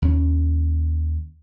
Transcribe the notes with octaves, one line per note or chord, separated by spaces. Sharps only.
D#2 C#4